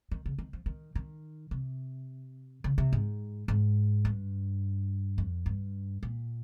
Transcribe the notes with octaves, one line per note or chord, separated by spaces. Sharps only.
D#3
C#3
D#3
F3
D#3
D#3
C3
C#3
C3
G#2
G#2
G2
F2
G2
A#2